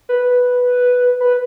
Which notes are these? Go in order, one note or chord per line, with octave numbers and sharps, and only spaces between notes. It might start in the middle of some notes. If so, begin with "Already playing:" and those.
B4
B4